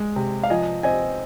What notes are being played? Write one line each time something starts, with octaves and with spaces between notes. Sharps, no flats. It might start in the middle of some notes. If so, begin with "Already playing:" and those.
Already playing: G#3
C3
F5
F3 D#5 G#5
C4 D#5 G#5